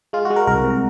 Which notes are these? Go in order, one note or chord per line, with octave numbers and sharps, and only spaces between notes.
G#3 F4
F#4
G#3
A#4
C2 A#4
C3